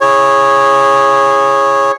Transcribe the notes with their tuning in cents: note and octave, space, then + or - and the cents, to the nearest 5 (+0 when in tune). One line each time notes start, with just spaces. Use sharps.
E4 +0 G#4 -15 C#5 -10